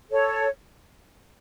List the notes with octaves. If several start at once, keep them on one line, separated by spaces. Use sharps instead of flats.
A4 C#5